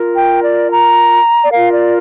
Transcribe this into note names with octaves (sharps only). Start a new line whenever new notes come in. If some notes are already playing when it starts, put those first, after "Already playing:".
Already playing: F4 A#4
G5
D5
A#5
D5
F4 A#4 F5
D5